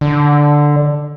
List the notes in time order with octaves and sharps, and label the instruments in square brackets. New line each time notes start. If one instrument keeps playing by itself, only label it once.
[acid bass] D3